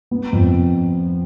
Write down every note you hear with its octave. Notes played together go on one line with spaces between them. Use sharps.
B3
F2